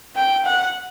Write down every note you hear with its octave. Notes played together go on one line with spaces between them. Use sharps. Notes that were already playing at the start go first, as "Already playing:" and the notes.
G5
F#5